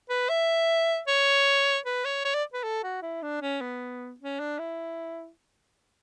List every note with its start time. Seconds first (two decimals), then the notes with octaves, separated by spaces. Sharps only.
0.10 B4
0.29 E5
1.08 C#5
1.86 B4
2.05 C#5
2.25 C#5
2.34 D5
2.53 B4
2.64 A4
2.84 F#4
3.02 E4
3.22 D4
3.42 C#4
3.61 B3
4.20 C#4
4.39 D4
4.59 E4